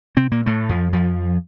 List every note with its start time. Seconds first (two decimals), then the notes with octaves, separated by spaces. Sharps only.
0.17 C3 C4
0.32 A#2 A#3
0.46 A2 A3
0.69 F2 F3
0.93 F2 F3